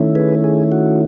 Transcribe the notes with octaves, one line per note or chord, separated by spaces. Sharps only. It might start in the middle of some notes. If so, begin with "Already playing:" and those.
Already playing: D#3 A3 C#4 E4
G#4 B4
G#4
F#4